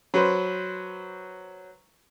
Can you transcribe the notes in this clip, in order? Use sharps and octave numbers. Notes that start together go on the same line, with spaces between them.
F#3 B4 C5